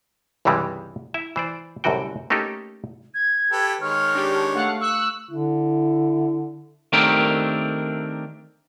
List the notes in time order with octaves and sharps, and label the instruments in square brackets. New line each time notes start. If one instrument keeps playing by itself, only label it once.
[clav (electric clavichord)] C#2 G2 C3 E3 G3 G#3
E4 E5
E3 C5 D5
C2 F#2 A2 D3 F#4 G5
A3 A#3 C#4 D#4 G4 A4
[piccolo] G#6
[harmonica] G4 A4 B4
[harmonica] D#3 G#3 C#5 [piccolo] F6
[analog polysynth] D4 G4
[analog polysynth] A3 F5 [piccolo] F#5
[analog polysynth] C#6 F#6 [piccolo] E6
[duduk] D3 [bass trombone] E4
[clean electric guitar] D#3 A3 C4 D4 G4 A#4